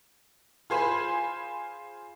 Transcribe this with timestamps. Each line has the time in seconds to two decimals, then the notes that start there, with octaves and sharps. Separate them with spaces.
0.70 F4 G#4 C5 G#5 B5